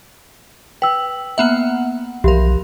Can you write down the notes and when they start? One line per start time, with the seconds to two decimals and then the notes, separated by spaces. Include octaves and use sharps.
0.82 B4 G5 E6
1.38 A#3 B3 E5 F#5
2.24 B1 E3 F3 G4 A#4